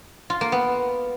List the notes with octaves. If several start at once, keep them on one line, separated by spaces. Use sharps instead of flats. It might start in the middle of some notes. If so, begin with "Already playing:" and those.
F4
A#3
B3